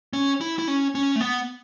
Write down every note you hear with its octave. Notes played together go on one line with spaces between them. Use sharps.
C#4
E4
E4
C#4
C#4
A3
B3